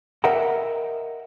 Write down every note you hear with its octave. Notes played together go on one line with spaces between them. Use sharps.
A#4 D#5 E5 F#5 G5 A#5